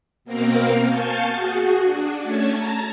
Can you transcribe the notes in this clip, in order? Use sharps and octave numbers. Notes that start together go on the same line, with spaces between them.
B2 A#3 C4 A#4 F5
F5 G#5 A5 C#6 G6 A6
F#4 G#4
D4
A3 C#4 A5 G#6
A5 A#5